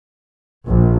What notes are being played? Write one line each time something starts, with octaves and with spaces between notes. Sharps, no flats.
A#1